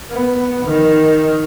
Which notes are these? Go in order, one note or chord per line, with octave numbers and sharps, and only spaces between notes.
B3
D#3